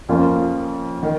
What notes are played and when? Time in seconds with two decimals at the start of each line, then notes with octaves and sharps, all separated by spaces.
0.09 F2 F3 A#3 C#4 F4
1.03 D#3